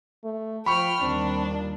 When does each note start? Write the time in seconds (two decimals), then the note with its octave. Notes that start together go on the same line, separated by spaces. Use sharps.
0.24 A3
0.66 F3 G5 B5 C#6 F6
1.01 D#2 D#3 G3 C4 D4
1.46 A#2